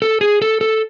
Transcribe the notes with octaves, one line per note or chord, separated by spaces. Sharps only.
A4
G#4
A4
A4